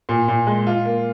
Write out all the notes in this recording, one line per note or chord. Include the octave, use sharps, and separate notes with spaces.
A#2
A#2
G#3
F4
A#3